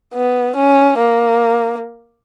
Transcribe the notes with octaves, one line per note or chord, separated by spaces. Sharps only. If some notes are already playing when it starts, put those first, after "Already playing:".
B3
C#4
A#3